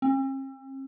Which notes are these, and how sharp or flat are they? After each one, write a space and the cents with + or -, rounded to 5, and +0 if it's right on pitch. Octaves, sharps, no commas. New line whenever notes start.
C4 +45